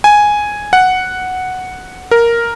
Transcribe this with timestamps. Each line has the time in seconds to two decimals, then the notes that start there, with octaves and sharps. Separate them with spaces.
0.04 G#5
0.73 F#5
2.11 A#4